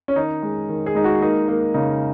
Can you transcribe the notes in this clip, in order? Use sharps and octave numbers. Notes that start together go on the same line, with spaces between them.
C#4
D#3 D#4
G#3
D#3
G#4
G#3 D#4
F#4
A#3 D#4
A#3
C#3 D#4